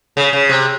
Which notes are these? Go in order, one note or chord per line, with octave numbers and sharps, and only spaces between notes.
C#3
C#3
C3